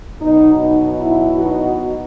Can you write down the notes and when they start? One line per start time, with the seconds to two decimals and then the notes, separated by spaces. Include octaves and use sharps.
0.21 B2 F#3 B3 D#4
0.61 D#4
1.01 E4
1.39 D#4 F#4